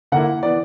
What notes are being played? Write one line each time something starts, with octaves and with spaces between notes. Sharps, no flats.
D3 A#3 E4 F#5
E3 B3 D5